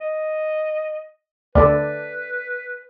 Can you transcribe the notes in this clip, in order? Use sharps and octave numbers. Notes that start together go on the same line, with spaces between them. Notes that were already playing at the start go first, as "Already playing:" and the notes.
D#5
D2 A4 B4 D5